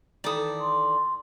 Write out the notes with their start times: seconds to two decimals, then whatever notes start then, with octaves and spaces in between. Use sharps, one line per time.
0.24 D#3 E3 A4 D5 D#6
0.61 C6